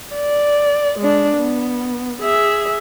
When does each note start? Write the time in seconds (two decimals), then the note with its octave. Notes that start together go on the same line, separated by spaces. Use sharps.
0.15 D5
0.99 G#3 D4
1.37 B3
2.22 G#4 E5